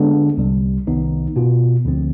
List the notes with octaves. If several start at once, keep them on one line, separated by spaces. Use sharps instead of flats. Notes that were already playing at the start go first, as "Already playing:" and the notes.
Already playing: D3 G#3 B3 D4
C2 C3 G3
C2 C3 D#3 B3 D#4
B2 B3 F4
D2 D3 F3 C4